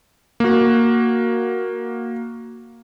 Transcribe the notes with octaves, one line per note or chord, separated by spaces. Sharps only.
A#3 F#4